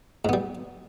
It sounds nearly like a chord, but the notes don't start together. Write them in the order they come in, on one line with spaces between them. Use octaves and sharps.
G#2 B3 G3